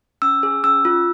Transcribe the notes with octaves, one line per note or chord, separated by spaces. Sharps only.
C#4 E6
G#4
C#4 E6
F4